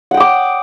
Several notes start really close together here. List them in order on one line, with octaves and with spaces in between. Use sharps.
F#5 G5 D#6 D6